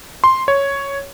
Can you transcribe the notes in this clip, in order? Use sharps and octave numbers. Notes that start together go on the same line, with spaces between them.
C6
C#5